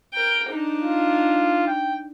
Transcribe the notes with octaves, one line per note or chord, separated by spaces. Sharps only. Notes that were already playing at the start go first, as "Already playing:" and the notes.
A#4 G5
D4 D#4
F4
G5